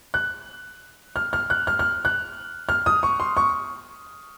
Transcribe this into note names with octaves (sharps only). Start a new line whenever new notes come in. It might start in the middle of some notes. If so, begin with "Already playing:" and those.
F#6
F6
F6
F#6
F6
F6
F#6
F6
D#6
C#6
C6
C#6